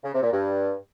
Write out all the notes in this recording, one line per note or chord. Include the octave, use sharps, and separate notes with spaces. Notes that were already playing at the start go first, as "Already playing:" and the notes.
C#3
C3
A#2
G2